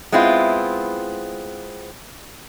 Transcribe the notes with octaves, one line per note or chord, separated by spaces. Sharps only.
G#3 B3 C4 E4 F4